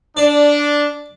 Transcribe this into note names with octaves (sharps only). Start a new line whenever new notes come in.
D4 D5